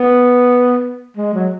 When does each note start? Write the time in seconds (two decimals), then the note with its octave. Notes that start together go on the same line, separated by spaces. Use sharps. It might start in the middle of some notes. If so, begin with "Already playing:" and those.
Already playing: B3
1.17 G#3
1.34 F#3